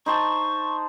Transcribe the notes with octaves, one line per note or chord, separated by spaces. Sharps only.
D#4 C5 A5 C#6